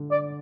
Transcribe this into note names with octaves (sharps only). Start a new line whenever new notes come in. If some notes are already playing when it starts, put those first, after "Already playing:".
Already playing: D3
D5